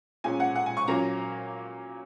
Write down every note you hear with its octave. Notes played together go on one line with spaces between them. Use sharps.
A#2 G#3 C#4 G#5
F#5
F#5
G#5
C#6
A#2 F#3 A#3 C#4 A#5